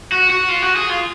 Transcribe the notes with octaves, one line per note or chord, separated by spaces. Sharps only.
F#4
F#4
F4
F#4
G#4
F4